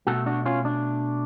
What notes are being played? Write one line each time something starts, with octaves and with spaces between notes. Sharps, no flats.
B2 A3 F#4 A4
D4 F#4
C#4 F4
D4